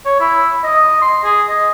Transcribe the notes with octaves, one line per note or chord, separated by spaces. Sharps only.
C#5
E4
D#5
C6
G#4
D#5